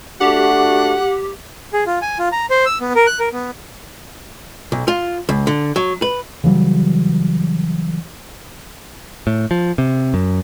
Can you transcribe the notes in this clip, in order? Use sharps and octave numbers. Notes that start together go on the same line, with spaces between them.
A3 D4 F#4 G4 F#5
G#4
F4
G#5
F4
A#5
C5
E6
B3
A#4
F#6
A#4
B3
B1
F4
C#2
D3
F#3
B4
C#3 E3 F#3 G3
A2
F3
C3
F#2